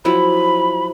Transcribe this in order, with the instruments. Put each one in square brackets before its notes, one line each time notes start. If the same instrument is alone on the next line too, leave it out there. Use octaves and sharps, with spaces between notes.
[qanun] F3 F#3 E4 [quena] B5